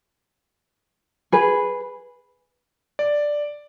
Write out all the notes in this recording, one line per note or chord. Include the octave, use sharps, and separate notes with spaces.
G#4 B4
D5